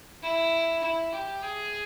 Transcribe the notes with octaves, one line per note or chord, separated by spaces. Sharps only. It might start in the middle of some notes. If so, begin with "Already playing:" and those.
E4
E4
G4
G#4